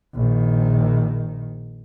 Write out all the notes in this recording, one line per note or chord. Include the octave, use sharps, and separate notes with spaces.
A#1 D#3